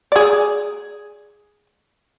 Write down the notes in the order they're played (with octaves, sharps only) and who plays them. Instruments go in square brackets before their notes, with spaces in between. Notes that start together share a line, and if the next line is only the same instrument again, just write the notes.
[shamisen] G#4 D5